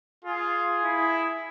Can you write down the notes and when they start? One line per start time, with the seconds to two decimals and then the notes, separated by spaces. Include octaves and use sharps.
0.24 F4 G#4
0.84 E4